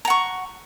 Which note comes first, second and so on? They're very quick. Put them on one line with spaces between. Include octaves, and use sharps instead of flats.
A#5 F#5 C#6